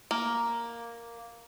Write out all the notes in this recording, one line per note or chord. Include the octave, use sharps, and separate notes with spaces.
A#3